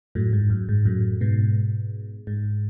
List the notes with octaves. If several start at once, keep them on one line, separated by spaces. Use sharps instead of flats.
F#2 A2
G#2
F#2
G#2
F#2 A2
G#2 B2
G#2